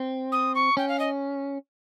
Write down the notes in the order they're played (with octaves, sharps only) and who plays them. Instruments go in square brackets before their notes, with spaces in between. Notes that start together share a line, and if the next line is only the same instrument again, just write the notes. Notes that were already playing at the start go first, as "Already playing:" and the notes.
Already playing: [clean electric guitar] C4
[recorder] D#6
C#6
[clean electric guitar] C#4 [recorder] G5
[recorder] F5
D#5